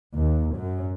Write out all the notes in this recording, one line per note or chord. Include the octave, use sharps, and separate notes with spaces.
D#2
F#2